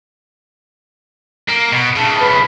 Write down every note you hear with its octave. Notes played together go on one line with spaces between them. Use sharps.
A#3
B2
C#3 E3 A5
B4